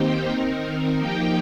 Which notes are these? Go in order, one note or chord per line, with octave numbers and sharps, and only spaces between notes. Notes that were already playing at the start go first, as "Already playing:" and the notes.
Already playing: D#3 A#3 C4 D#4 G4 C5 G5
D#3 C4 D#4 A#4
A#4
F3 A#3 D#4 G4 G5